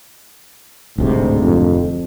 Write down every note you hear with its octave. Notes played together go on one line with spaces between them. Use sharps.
D1 D2 G#2 C3
F2